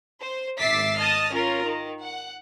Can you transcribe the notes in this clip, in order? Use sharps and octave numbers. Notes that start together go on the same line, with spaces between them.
C5
G#1 E5 D6 A6 B6 C7
D#5 A5 D#6 F6
C#4 F4 A#4
D#3
F#5